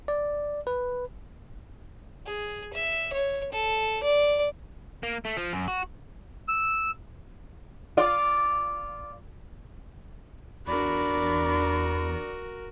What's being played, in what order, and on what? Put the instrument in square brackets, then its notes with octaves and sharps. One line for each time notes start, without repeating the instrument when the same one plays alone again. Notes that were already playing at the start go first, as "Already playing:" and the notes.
[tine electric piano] D5
B4
[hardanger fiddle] G#4
E5
C#5
A4
D5
[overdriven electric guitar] A#3
A3
F3
F#2
F#4
[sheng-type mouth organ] E6
[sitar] F4 D5
[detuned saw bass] E2 [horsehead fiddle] D4 D5 [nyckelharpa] F#4 A#4 [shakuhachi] B5